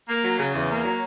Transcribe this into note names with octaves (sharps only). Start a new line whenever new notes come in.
A#3
F#3
C#3
E2
A#3
F#3